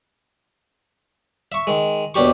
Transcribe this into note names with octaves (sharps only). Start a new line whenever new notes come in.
E5 C#6
D#3 G#3
D#2 B2 D4 G4 C#6